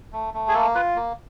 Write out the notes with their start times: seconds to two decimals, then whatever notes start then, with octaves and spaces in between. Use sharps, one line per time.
0.13 A3
0.34 A3
0.48 G#4
0.54 A#3 A4
0.75 F4 B4
0.96 A#3